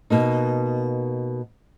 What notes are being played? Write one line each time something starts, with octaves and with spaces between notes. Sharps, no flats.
B2 A#3 D#4